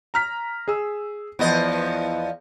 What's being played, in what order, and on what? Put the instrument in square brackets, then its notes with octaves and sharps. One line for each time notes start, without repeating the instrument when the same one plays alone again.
[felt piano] A#5 F6 B6
G#4 E6
[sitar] E2 F3 D#5 [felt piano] B3